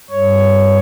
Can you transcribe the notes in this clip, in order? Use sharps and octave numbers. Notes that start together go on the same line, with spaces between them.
G2 C#5